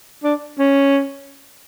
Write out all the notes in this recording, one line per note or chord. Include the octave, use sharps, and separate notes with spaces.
D4
C#4